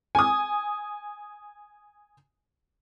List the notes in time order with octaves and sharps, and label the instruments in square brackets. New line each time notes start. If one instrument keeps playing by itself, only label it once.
[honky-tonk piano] G#5 D#6